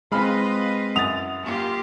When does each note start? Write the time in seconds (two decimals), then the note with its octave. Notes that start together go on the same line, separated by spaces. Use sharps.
0.12 G#3 C4 F4 B4 D#5 F5 B5 F6
0.96 F#2 F#5 D#6 A6 F7
1.45 A#3 F4 G4